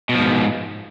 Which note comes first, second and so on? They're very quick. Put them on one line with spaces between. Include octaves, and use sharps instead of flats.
B2 F3 G#2